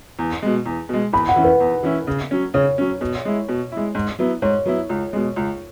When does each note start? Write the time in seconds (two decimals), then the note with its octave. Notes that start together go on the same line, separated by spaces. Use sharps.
0.19 E2
0.42 B2 G#3
0.66 E2
0.89 B2 G#3
1.13 E2 B5
1.29 F#5
1.36 E3 C#4 E4
1.44 B4
1.60 E2
1.83 E3 C#4 E4
2.07 C#3
2.31 F#3 C#4
2.54 C#3 C#5
2.78 F#3 C#4
3.01 B2
3.25 G#3 E4
3.49 B2
3.72 G#3 E4
3.95 G#2
4.19 F#3 B3 E4
4.42 G#2 C#5
4.65 F#3 B3 E4
4.89 C#2
5.13 B2 G#3
5.36 C#2